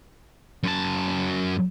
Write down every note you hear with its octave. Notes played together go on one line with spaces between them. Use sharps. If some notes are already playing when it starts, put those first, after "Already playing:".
F#2 A5